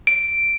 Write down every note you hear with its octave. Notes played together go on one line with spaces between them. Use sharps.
D7